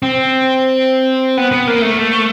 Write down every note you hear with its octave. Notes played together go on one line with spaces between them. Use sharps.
C4
B3
B3
A#3
A3